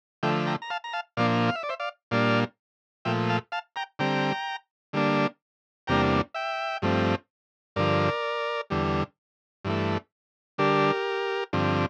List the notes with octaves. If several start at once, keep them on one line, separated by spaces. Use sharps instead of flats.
D3 F3 A3 E5 G5
G5 A#5
A#5
F5 A5
A#5
F5 A5
A#2 F3 A#3 D4 D5 F5
F5
E5
D5
C5 E5
D5 F5
A#2 G3 A#3 D4 D5 F5
A#2 F3 A3 E5 G5
F5 A5
F5 A5
G5 A#5
D3 G3 C4 G5 A#5
D3 G3 A#3 D4
E2 C3 G3 A#3 D4 G5 A#5
E5 G5
G2 F3 A3 C4
G2 D3 F3 A#4 D5
E2 D3 G3
G2 E3 A3
D3 G3 D4 G4 A#4
G2 D3 F3 C4